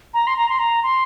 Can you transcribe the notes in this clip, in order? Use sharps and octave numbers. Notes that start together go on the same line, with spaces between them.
A#5
C6
A#5
C6
A#5
C6